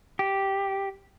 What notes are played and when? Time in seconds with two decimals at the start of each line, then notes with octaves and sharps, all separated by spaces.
0.19 G4